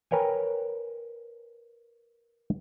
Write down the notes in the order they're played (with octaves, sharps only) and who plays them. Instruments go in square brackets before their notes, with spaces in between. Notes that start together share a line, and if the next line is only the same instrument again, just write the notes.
[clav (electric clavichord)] A#4 B4 C#5 G5 G#5